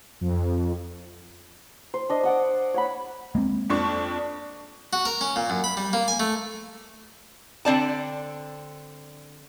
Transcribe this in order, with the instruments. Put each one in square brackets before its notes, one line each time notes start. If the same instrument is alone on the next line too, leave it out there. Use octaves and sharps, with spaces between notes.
[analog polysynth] F2
[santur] C5
D4 D#5
D5 F#5 D#6
C#5 F#5 B5
[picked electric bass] G#3 A#3 C4
[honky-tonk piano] F2 D4 C#6
[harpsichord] F#4
A#4
C#4
A#2
F#2
B5
G3
A#3
G#5
A3
[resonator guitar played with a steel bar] D3 C4 D5 A5